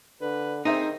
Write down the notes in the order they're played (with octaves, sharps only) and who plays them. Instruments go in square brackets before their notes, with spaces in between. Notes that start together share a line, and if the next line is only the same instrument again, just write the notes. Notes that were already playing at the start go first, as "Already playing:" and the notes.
[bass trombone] D3 [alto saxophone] B4
[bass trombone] D#3 [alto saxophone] C4 [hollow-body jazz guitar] D#4 [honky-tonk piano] G#4 C5 E5